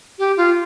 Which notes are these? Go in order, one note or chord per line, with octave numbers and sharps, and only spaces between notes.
G4
F4